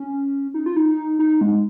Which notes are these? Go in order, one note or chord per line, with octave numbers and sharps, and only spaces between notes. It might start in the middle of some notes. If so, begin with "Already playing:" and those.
Already playing: C#4
D#4
F4
D#4
D#4
G#3